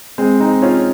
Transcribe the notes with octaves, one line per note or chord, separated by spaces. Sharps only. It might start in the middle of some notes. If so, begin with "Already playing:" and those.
G#3 C4
C4 D#4
C#4 F4